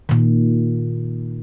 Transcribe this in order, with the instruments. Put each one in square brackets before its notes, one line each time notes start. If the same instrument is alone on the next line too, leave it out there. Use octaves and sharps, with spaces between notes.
[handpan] A#2 D#3